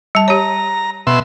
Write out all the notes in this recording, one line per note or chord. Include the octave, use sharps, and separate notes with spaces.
G3 A5
G4 C#5 A#5
B2 E5 C6